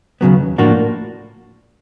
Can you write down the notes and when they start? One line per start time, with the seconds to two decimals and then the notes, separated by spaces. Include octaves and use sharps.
0.21 D#2 C#3 F#3 B3
0.58 A2 F3 A#3 D4 F#4